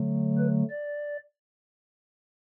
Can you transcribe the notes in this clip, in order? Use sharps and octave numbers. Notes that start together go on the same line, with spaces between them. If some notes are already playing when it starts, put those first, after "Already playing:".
Already playing: D3 F#3 A3
B4
D5